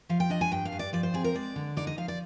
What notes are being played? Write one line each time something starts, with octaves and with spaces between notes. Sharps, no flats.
F3 F5
G5
D4 D#5
G#5
G2 G5
F5
G2
D5
F3 D5
C5
C4 G#4
A#4
G#3 D5
D3
D#4 D5
D#5
F3 F5
D5